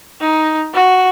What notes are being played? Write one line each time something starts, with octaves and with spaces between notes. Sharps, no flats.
D#4
F#4